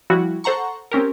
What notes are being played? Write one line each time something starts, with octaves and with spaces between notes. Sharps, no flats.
F3 G3 E4 F#4
A4 C5 F#5 A#5 C#6
C4 C#4 G4 A#4